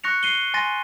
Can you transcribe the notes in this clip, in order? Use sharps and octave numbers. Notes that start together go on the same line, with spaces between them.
C#6 F#6 A#6 C#7 F7
C7 D#7 G7
G#5 C6 A6 A#6 D#7